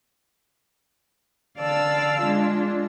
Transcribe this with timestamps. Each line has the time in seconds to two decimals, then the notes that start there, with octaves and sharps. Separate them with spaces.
1.58 D3 D5 F5 A5 E6
2.21 G#3 D4 F4